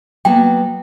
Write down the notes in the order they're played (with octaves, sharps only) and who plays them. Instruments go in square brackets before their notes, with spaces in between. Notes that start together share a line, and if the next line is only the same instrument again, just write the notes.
[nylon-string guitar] F#3 A#3 B3 [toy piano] G5